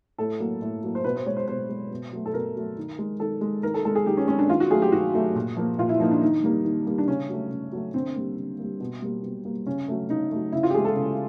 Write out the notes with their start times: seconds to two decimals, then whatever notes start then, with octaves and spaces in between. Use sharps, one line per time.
0.18 A2 A4
0.40 F#3 A#3
0.62 A2
0.83 F#3 A#3
0.95 C5
1.04 B2 B4
1.16 C5
1.26 G#3 C#5
1.37 C5
1.48 B2 C5
1.69 G#3
1.91 B2
2.12 F#3 A3
2.26 A4
2.34 B2 A#4
2.56 F#3 A3
2.77 D#3
2.99 G#3
3.20 D#3 A4
3.41 G#3
3.63 D#3 A#4
3.74 A4
3.85 G#3 A4
3.95 G#4
4.06 D#3 G4
4.17 C#4
4.28 G#3 C#4
4.39 D4
4.49 D#3 F4
4.60 F#4
4.71 F#3 A3 G#4
4.82 G4
4.92 D#3 F#4
5.13 F#3 A3
5.35 A#2
5.57 F3 A#3
5.78 A#2 F4
5.89 E4
6.00 F3 A#3 D#4
6.11 D4
6.21 D#3 D#4
6.43 G3 A#3
6.65 D#3
6.87 G3 A#3
6.98 D4
7.07 C#3 C#4
7.29 F#3 A3
7.51 C#3
7.72 F#3 A3
7.94 D3 C4
8.16 G3 A#3
8.37 D3
8.59 G3 A#3
8.80 B2
9.02 G3 A#3
9.23 B2
9.45 G3 A#3
9.66 C#3 C#4
9.88 F#3 A3
10.09 C#3 D#4
10.31 F#3 A3
10.52 C#3 E4
10.63 F4
10.70 G4
10.74 E3 G#3 G#4
10.85 A4
10.96 C#3